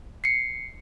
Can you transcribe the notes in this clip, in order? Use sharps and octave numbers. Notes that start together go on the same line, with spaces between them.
C7 C#7